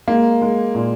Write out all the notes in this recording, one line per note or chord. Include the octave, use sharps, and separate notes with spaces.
G#3 A#3
G#3
A#2